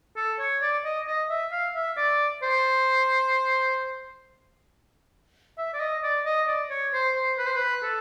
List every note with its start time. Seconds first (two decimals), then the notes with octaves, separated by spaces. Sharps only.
0.16 A4
0.39 C#5
0.62 D5
0.85 D#5
1.07 D#5
1.30 E5
1.52 F5
1.75 E5
1.97 D5
2.42 C5
5.58 E5
5.74 D5
5.80 D#5
6.03 D5
6.26 D#5
6.47 D5
6.70 C#5
6.93 C5
7.15 C5
7.38 B4
7.46 C5
7.56 B4
7.83 A4